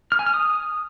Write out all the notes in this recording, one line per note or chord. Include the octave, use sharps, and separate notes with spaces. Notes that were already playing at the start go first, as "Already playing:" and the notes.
F6
G#5
F6
D#6